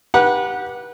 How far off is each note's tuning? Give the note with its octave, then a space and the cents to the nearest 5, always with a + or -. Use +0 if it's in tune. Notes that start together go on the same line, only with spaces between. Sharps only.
G4 +0 B4 -30 F#5 -10